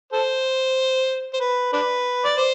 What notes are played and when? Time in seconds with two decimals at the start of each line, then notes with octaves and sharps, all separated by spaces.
0.13 A4 C5
1.34 C5
1.40 B4
1.73 D4 B4
2.25 D5
2.37 C5